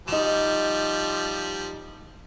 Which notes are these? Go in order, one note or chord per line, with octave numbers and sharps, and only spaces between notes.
F3 G3 D#4 E7